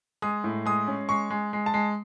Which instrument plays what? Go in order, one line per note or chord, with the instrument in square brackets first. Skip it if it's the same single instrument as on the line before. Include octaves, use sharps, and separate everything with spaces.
[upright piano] G#3 D#6
A2
G#3 D#6
C#4
G#3 C#6
G#3
G#3
A5
G#3